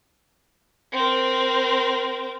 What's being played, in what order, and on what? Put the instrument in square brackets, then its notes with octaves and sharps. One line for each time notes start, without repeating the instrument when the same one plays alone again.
[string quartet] C4 A#4